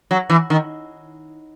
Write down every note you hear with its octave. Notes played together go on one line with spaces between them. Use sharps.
F#3
E3
D#3